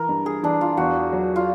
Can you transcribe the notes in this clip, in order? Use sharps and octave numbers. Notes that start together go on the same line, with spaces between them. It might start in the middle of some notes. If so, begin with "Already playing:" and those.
Already playing: E3 A#4
G2
G#4
E3 D4
F4
E2 F#4
F#3
F4